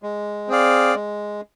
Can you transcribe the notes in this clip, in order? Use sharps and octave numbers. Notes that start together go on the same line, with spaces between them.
G#3
C4 G#4 D5 F5
G#3